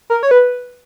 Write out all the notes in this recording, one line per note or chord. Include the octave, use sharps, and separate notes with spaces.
A#4
C#5
B4